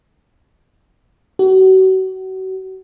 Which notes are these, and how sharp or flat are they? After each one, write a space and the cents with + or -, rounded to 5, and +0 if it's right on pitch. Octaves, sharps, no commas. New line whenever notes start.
F#4 +35